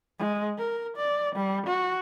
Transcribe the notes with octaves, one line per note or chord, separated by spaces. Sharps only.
G#3
A#4
D5
G3
F#4